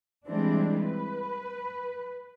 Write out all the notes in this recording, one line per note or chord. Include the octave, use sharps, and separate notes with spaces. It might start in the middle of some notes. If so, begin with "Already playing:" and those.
E3 G3 G#3 C4 D4
B4